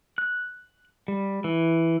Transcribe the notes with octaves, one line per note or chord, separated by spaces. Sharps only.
F#6
G3
E3